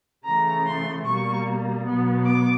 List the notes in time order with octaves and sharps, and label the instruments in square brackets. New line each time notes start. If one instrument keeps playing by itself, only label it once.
[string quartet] C#3 E3 A3 A#5
C6
B2 G3 A#3 C#6
B2 F#3 B3
D6